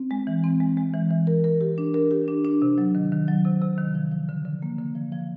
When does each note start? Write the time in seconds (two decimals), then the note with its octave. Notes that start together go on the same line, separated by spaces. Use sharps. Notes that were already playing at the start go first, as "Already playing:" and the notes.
Already playing: C4
0.11 G#3
0.27 E3
0.44 C4
0.60 G#3
0.77 G#3
0.94 E3
1.10 E3
1.27 A#4
1.44 A#4
1.61 G4
1.78 D4
1.94 A#4
2.11 G4
2.28 D4
2.45 D4
2.62 C3
2.78 F#3
2.95 D#3
3.12 D#3
3.28 F#3
3.45 C3
3.62 C3
3.78 D#3
3.95 F3
4.12 F3
4.29 D3
4.45 D3
4.62 A#3
4.79 D3
4.95 F3
5.12 F3